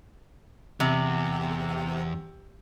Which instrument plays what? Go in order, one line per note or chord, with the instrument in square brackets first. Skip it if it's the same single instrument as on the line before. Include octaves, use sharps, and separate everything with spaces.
[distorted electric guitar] E2 [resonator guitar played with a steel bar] C3